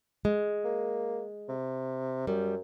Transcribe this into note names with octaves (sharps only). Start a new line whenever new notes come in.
G#3
A#3
C3
F#2 G3